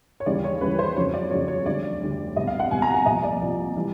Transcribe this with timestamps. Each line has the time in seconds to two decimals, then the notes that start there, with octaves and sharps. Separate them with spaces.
0.20 C#5
0.26 D#2 C#3 E3 G3 D5
0.44 C#5
0.61 D#2 C#3 E3 G3 B4
0.79 C5
0.96 F2 C#3 F#3 C#5
1.14 D5
1.31 F2 C#3 F#3 C#5
1.48 C#5
1.66 D2 D3 G3 D5
2.01 D2 D3 G3
2.36 C2 B2 G3 D#5
2.47 F5
2.59 F#5
2.71 C2 B2 G3 G#5
2.82 A#5
2.94 G#5
3.06 C2 A#2 F3 D#5
3.23 D5
3.41 C2 A#2 F3
3.76 E3 G3